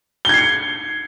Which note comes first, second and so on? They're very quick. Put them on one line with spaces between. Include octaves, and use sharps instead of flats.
G7 G#6 C7 C#7